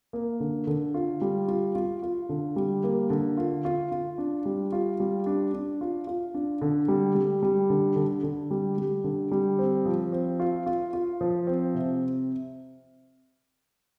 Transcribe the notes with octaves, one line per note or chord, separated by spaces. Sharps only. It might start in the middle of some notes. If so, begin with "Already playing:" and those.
A#3
D3
D3
F4
G3
F4
F4
F4
D3
G3
A#3
D3
F4
F4
F4
D4
G3
F4
G3
D4
D4
F4
F4
D4
D3
G3
G3
G3
D3
D3
D3
G3
G3
D3
G3
C4
F3
C4
F4
F4
F4
F3
C4
C3